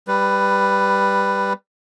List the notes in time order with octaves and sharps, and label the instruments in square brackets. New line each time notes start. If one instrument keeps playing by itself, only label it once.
[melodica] G3 B4